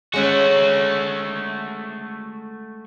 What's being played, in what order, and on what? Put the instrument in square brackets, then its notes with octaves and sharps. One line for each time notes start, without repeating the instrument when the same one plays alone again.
[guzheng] G#3 C#4 F#5 [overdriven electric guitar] A3 F#4